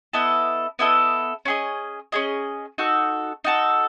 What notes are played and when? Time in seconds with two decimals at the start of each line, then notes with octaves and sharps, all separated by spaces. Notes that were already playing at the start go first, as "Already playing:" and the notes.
0.13 B3 E4 A4 D#5
0.79 B3 E4 A4 D#5
1.45 C#4 G#4 D#5
2.12 C#4 G#4 D#5
2.78 D#4 F#4 A4
3.44 D#4 F#4 A4